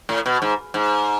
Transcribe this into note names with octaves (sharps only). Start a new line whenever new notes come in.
A2
B2
G#2
G#2